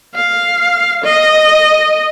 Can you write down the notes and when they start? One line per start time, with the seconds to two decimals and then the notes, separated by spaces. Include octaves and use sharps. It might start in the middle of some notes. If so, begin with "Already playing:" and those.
0.15 F5
1.05 D#5